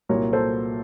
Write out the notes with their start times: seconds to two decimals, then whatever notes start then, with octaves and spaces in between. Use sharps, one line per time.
0.09 C2 A#2 F#3 A#4 C#5
0.33 A4 C5